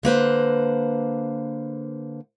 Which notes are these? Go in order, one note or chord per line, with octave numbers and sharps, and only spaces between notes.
D3 A#3 B4 C5